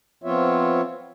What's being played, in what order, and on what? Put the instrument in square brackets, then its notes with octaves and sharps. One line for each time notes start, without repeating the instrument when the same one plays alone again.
[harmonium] F3 B3 C4 F4 C#5 E5